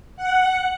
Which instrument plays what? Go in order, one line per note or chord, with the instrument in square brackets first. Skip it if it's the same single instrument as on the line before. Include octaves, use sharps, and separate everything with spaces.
[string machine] F#5